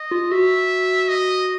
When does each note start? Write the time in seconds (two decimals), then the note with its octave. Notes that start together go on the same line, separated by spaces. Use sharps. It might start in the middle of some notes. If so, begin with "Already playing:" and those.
Already playing: D#5
0.11 F4
0.32 F#4 E5
1.08 D#5